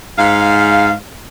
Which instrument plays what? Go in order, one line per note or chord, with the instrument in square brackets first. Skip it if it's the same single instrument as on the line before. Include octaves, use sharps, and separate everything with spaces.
[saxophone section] G#2 F5